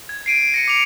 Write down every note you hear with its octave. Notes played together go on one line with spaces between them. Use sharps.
G#6
C7 D7 D#7
A#6 C#7 D#7
D6 F7